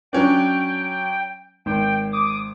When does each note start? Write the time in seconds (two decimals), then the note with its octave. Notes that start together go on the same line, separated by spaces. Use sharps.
0.13 F#3 C#4 D4 G5
1.66 G#1 G5
2.13 D6 D#6